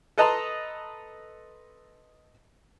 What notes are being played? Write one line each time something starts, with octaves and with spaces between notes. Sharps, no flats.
A4 B4 D#5 A5 A#5 C6